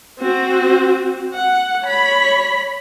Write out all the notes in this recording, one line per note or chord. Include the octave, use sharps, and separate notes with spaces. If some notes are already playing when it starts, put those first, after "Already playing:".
C4 F#4
F#5
C#5 B5